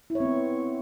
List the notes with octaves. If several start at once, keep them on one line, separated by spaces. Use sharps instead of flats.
E4
C#5
C4
B3